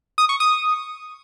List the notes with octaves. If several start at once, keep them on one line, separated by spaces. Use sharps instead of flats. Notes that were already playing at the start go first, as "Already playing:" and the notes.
D#6
C#6
D#6